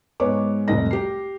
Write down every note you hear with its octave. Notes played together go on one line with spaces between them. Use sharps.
G#2 G#3 B3 C#5 D6
F1 C2 A2 C3 D#5 A#6
G4 C7